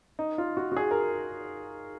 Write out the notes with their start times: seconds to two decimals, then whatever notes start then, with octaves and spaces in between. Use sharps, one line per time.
0.19 D#4
0.38 F4
0.57 F#4
0.72 F#4
0.76 G#4
0.91 A#4